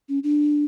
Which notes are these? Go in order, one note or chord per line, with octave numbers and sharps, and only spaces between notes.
C#4
D4